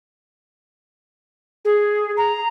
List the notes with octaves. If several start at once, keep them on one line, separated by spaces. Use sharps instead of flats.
G#4
A#5